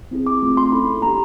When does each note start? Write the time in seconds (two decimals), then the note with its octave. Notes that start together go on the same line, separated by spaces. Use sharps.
0.11 C4 E4 G#4
0.27 D6
0.43 A3 C4 F4
0.57 C6
0.72 C#4 E4 A4 B5
1.02 A#3 D4 G4 A#5